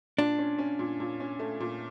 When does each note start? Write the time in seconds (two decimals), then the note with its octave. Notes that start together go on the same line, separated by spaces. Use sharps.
0.18 A#2 D4
0.39 C#4
0.59 C#4
0.79 A#2
1.00 A#2
1.20 C#4
1.39 A3
1.60 A#2